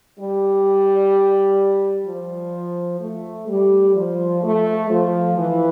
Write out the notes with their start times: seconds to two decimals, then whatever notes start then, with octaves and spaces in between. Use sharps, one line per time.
0.16 G3
2.06 F3
3.01 A3
3.47 G3
3.94 F3
4.43 A3
4.90 F3
5.37 E3